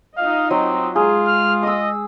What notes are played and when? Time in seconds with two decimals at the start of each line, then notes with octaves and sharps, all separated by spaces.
0.17 D#4 F4 D#5 F5
0.51 F#3 C4
0.96 G#3 F4 G#4
1.27 F6
1.63 D#5 D#6 E6